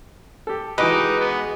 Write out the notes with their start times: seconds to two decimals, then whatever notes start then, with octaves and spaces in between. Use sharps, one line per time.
0.47 G4 A4
0.78 E3 G#3 D#4 F#4 G4 B4 D6
1.20 B3